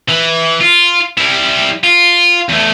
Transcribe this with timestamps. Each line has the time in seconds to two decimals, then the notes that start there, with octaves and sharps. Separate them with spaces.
0.08 E3
0.61 F4
1.18 G3 E4
1.84 F4
2.49 E2 A3